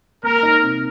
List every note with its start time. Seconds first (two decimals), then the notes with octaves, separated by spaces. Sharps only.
0.23 A#3 A#4
0.43 D#4
0.63 C3